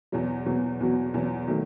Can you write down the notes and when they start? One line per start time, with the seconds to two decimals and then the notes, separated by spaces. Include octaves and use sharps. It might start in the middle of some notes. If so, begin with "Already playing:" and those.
0.12 E2 B2 F#3
0.46 E2 B2 F#3
0.80 E2 B2 F#3
1.14 E2 B2 F#3
1.48 D#3 F#3 A3